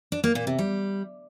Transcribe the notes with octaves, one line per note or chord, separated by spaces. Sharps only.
D4
A#3
A#2
C3
G3